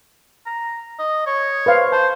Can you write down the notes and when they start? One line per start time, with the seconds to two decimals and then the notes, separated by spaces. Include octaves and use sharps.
0.46 A#5
0.99 D#5
1.26 C#5
1.66 B4 C5 F5
1.92 C5 A5